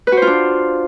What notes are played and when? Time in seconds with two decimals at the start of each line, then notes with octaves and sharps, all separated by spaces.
0.07 B4
0.12 F#4
0.17 C5
0.22 F4
0.27 D4